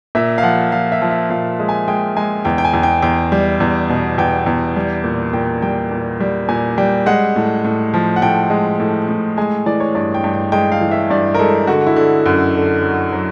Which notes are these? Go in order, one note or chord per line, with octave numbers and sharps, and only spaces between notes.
A#2 E5
F5
F3 F#5
F3 F5
E5
F3
E5
A#2 F5
G#3
G#5
G#3 G5
G#3 G#5
E2 G5
G5
G#5
E2
G5
E2 G5
G3
E2
B2
E2 G5
E2
G3
A#2
A#2 G5
G3 G5
A#2
G3
A#2 G#5
G3 G5
G#3 F#5
A2
A2
F3
F#5
A2 G5
G#3
A2
A2
G#3 G#5
E3 D5
C#5
G2 D5
G5
G2
G5
G#3 G5
F5
E3
E5
G2 D5
A#4
G#3 A4
D3 F#4
E4
D3
F#2
D3
F#3
F#3